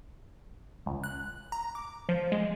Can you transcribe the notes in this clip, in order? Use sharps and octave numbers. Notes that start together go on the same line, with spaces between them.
C#2
F#6
A#5
D6
F3
G#3